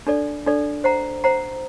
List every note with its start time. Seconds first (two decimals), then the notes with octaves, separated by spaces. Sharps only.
0.07 D4 A4 D5
0.46 D4 A4 D5
0.84 C5 F#5 A#5
1.24 C5 F#5 A#5